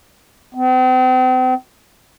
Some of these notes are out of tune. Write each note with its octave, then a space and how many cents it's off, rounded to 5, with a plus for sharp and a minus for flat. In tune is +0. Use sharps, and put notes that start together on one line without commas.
C4 -40